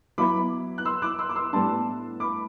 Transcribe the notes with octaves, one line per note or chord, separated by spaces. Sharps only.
F#3 B3 E4 B5 D6
F#6
C6 E6
D6 F#6
C6 E6
D6
C6 E6
A2 G3 B3 D4 A5 C6
B5 D6